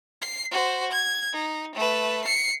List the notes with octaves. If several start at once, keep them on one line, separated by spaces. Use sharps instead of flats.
C7
F#4 C5
G#6
D#4
A3 B4
C7 C#7